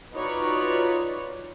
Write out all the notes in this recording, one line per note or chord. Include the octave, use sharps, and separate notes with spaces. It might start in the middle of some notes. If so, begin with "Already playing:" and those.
D#4 F4 F#4 B4 C#5 D5